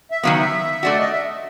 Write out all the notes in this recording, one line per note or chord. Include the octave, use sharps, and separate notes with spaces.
E5
D#3 F#3 B3 F5
E5
A3 D4 F#4 D5
D#5
E5